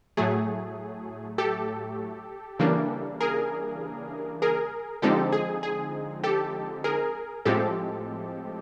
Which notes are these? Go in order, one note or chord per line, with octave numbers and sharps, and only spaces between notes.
A2 F#3 A3 G#4
G4 A4
C#3 E3 G3 A#3 D4
G#4 A#4
G#4 A#4
D3 F3 G#3 C4 D#4 G4 A4
G#4
G#4
G4 A4
G#4 A#4
A2 F3 G#3 C4 G4 A4